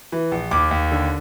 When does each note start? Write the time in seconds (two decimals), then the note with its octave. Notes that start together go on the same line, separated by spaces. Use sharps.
0.12 E3
0.32 A#1
0.51 D#2 D6
0.71 D#2
0.92 D3